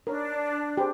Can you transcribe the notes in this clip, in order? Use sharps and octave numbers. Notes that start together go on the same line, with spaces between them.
D4 A#4 C#5
G4 G#4 C5